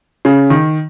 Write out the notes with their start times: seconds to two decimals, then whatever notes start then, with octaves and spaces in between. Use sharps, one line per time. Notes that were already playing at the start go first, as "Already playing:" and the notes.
0.25 C#3
0.50 D#3